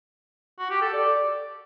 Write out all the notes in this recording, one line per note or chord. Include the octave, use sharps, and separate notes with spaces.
F#4
G4
A4
D5